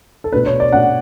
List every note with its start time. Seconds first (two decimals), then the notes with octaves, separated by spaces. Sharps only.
0.24 A4
0.32 B2 A3 D4 B4
0.46 C#5
0.60 D5
0.72 B2 A3 D4 F#5